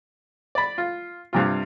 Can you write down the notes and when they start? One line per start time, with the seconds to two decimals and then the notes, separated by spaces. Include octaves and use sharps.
0.55 D5 B5
0.78 F4
1.33 G2 C3 F4